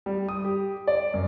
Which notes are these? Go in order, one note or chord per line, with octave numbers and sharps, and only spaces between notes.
G3
D#6
G4
D5
F#2